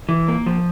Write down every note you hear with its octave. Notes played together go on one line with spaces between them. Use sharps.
E3
A#3
F3